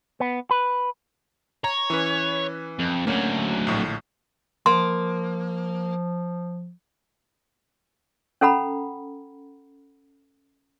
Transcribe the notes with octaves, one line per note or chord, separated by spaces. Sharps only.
B3
B4
C#5 A#5
E3 C#4 B4
F2
D2 F#3 A#3 C#4
A#1 A2
F3 A#3 C6
C#4 A4 F#5 A#5 B5